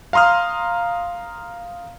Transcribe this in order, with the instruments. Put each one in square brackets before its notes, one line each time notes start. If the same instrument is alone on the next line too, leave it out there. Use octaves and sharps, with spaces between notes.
[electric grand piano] F5 A#5 C6 D#6 F6